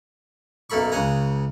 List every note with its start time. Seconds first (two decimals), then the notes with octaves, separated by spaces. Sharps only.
0.70 B1 F#2 A#3 A4 B5 C#6
0.92 C#2 C#3 F#5 G#5 A#5